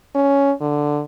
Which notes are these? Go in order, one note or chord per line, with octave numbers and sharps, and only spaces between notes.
C#4
D3